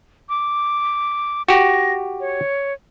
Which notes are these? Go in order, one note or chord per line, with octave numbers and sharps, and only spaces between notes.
D6
F#4 G4 A#6
C#5